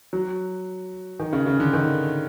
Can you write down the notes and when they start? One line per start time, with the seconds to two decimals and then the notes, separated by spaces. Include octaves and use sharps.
0.13 F#3
1.20 D#3
1.33 C#3
1.46 C#3
1.60 D3
1.73 D#3